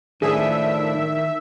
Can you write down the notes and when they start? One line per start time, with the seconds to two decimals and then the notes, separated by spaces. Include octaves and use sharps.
0.22 A2 D#3 F3 D4 G#4 E5